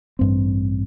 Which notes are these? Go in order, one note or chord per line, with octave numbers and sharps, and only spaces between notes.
A1 G2 C4